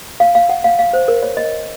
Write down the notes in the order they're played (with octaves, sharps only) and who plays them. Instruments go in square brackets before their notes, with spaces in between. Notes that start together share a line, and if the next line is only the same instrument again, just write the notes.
[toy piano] F5
F5
F#5
F5
F5
C5
A#4
C#5
D#5